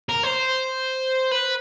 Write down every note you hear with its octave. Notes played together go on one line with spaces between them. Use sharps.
A#4
C5
B4